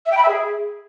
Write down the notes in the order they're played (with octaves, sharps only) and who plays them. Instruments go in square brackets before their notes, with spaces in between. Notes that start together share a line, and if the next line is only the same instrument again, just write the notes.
[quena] E5
G5
B5
E5
G#4